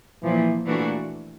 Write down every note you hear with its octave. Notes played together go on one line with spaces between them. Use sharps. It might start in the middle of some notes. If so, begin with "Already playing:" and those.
A#2 E3 F3 A#3
A#2 E3 A3 D4 F#4